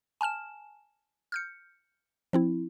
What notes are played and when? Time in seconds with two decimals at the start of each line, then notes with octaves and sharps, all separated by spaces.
0.21 G#5 A5 F6 E7
1.32 F6 G6 C#7
2.33 F3 C4 E4